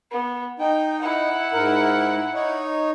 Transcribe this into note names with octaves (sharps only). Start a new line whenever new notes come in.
B3
D#4 G5
E4 F#5
G#2 A#4
D#4 C#5